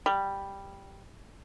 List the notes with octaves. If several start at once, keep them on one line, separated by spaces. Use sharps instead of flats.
G3